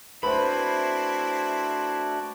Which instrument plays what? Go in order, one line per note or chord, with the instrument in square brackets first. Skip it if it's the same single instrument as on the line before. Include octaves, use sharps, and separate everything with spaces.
[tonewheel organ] A3 D4 F#4 [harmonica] C4 E4 [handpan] B4 C5 [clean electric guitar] B5